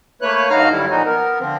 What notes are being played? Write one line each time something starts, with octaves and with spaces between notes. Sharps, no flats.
A3 A#3 B4 C#5 F#6
G2 D#4 F#4 F5 A#5 F6
G2 D3 F#3 G3 E4
A#2 F3 D#4 F#4
B3 A#4
D3 F3 C4